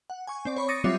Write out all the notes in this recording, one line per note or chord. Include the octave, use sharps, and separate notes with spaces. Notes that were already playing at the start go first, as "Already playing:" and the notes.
F#5
G#5 C#6
C4 D5
C#5 B5 C#6
D6 D#6 A6 A#6 C#7 D#7
F#3 G3 C4 F4 C#5 E5